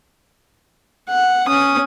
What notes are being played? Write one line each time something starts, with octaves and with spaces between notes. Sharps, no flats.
F#5
C#4 D#6